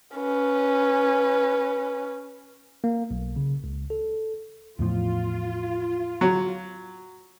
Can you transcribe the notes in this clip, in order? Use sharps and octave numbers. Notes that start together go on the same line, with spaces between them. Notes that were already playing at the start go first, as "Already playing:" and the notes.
C#4 B4
A#3
B1
C#3
C#2
A4
E2 A2 F3 F4
F#3